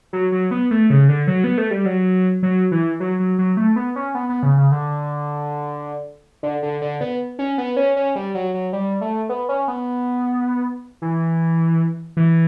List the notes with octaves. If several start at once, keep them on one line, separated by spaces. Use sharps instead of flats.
F#3
F#3
B3
A3
C#3
D3
F#3
B3
A3
G3
F#3
F#3
E3
F#3
F#3
F#3
A3
B3
C#4
B3
B3
C#3
C#3
D3
D3
D3
D3
B3
C#4
B3
C#4
C#4
G3
F#3
F#3
G3
A3
B3
C#4
B3
E3
E3